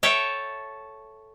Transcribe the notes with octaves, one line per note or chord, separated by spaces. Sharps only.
A4 C#5 E5 G5 A5